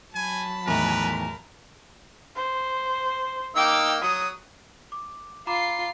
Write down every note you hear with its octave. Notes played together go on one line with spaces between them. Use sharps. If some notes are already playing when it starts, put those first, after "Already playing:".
F#3 G#5 A5 B5
E2 A2 D#3 A#4 B4
C5
A#3 D#4 G5 D6 E6
F#3 D#6
D6
F4 A#5 B5 D6 C7